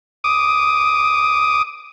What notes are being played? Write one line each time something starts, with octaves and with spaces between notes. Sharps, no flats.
D6 D#6